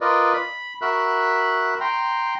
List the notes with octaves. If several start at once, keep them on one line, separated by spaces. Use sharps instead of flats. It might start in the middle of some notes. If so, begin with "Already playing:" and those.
F4 A#4 B4 D5 D#5
B5
F#4 A#4 E5 B5 F#6
G5 A#5 C6